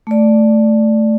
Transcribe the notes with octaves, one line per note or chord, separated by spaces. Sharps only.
A3 D5